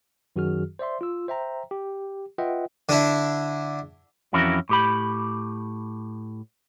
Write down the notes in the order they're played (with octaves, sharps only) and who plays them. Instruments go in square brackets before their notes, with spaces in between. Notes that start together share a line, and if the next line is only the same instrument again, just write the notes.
[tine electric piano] F#2 D#3 F#3 F#4 G#4 F6
C5 D5 E5 C6
F4 E6
C5 E5 G5 A#5
G4
F4 B4 D#5 E5 F#5 G5
[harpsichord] D3 D4 E4
[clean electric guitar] F2 E3 C#4 E4 F#4 A#4
A2 G4 B5